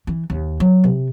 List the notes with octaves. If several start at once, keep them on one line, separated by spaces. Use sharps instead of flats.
E3
D#2
F#3
C3